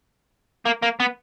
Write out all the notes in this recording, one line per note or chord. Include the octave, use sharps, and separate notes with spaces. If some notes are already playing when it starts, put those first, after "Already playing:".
A#3
A#3
B3